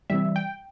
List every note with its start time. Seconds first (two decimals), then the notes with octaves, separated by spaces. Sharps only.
0.10 C3 E3 G3 E5
0.36 G5